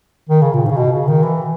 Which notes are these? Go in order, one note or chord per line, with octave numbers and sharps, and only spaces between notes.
D#3
C#3
A#2
G#2
C#3
B2
C#3
D#3
E3